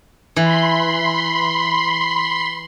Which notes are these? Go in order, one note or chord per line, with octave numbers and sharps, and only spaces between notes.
E3 B5 C6